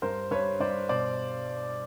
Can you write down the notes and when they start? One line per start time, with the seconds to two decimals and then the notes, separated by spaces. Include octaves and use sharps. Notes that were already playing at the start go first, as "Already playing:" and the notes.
0.02 G2 A#4 C5
0.31 G2 B4 C#5
0.60 G2 C5 D5
0.89 B2 C5 D5